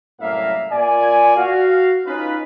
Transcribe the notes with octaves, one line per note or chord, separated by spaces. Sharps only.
C2 F#2 A2 A#3 E5 F5
A#2 D5 G#5
F#4 F5
C#4 D#4 F4 B4